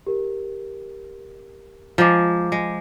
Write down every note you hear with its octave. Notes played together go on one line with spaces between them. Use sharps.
G4 A#4
F3 G#3 A#5 D6
G#3